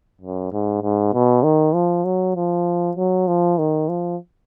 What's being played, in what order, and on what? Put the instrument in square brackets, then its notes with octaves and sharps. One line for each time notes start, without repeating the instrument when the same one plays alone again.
[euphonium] F#2
G#2
G#2
B2
D#3
F3
F#3
F3
F#3
F3
D#3
F3